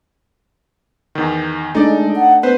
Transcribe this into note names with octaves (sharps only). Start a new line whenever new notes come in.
E2 D#3
G#3 A3 D4 D#4 A4 D5
F#5
B3 B4 C5